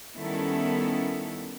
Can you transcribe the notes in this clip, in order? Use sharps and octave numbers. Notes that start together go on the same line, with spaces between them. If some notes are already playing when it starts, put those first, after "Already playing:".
D#3 G3 B3 C#4 E4 A4